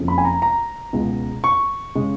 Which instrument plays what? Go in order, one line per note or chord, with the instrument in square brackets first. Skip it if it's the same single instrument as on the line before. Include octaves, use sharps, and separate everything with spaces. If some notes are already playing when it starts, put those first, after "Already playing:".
Already playing: [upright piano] F#1 F2 C#3
B5
G#5
A#5
A#5
C#2 B2 G#3
C#6
C#3 G#3